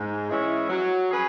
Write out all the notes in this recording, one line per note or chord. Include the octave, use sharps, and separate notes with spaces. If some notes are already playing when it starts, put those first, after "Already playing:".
Already playing: G#2
E3 G#3 C#4 E4
F#3
C#4 G#4 B4